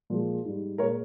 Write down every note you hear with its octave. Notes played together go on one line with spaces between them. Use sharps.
A#2 F3 G#3
G#2 G3
A#2 G#3 A#4 C#5